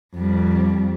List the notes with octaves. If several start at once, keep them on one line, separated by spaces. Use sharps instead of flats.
F2 G3